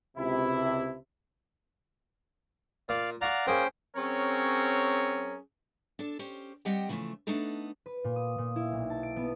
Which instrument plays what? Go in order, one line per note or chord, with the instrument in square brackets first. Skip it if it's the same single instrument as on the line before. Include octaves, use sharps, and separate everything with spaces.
[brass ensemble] C#2 C3 E4
[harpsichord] A#2 [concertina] D5 F5
[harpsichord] F#4 F#5 [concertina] D5 F5 A#5
[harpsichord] A#3 G#4 A#4 [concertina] C#4 C5 G5
[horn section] F#3 C4 C#4 G#4 A#4 C#5
[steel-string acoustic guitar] D4 A4
C#4 G4 C5
G3 C4 G4 D#5 F#5 G5
C#3 E3 F3 G#3 A3
A3 B3 D4 D#4 A4
[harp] B4
A#2
D#6
A#2
E4
B1
A5
D7
B3